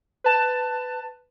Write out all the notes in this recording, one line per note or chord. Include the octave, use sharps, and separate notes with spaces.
B4 A5